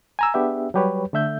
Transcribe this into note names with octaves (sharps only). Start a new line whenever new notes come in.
G#5 A#5 E6
B3 D4 G4 G#4 E5
F#3 G3 G4 B4 C#5
D3 A3 E5 G6